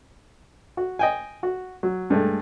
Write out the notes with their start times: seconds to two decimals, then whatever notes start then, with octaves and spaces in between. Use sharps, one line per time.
0.77 F#4
0.99 D#5 G5 G#5
1.43 F#4
1.83 F#3
2.10 G2 G#3 A3